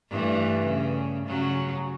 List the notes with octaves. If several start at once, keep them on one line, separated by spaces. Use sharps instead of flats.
G2 E3 A3
C#3
C#3 F#3